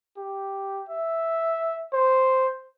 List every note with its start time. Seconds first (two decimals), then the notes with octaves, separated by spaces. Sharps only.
0.17 G4
0.89 E5
1.93 C5